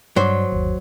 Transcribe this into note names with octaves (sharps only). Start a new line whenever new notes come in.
G2 F#3 C5 D5
G1 D#2